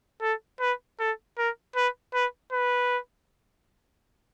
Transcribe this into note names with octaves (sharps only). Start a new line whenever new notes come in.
A4
B4
A4
A#4
B4
B4
B4